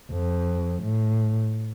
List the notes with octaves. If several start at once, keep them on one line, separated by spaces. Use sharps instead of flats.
F2
A2